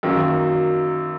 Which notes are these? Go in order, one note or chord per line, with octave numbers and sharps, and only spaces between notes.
F#2 D#3 F#3 A#3